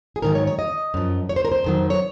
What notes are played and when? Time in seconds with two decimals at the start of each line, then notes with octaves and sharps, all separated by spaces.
0.16 G#4
0.22 G#2 D#3 F#3 A#4
0.35 C#5
0.47 C#5
0.59 D#5
0.94 F#2 F3
1.29 C#5
1.36 C5
1.45 A#4
1.52 C5
1.64 F2 D#3 F#3
1.90 C#5